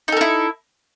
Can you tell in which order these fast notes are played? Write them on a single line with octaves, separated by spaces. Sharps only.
D#4 A4 A#4 E4